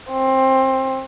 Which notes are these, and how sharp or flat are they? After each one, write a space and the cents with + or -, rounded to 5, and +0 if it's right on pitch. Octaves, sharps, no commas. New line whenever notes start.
C4 +20